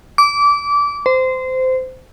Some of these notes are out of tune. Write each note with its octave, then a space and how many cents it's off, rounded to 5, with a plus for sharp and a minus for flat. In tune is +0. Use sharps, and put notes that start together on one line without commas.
D6 -25
C5 -20